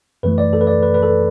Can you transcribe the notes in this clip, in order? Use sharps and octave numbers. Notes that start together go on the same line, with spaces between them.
F#2 E3 A3 B4
D5
A4
B4
D5
B4
B4
A4